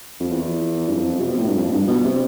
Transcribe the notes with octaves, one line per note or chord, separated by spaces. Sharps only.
F2
E2
G2
F2
C3
B2
A2
G2
F2
A2
G2
B2
C3